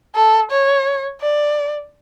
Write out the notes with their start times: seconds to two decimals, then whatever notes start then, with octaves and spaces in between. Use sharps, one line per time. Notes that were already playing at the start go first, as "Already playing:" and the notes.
0.15 A4
0.51 C#5
1.22 D5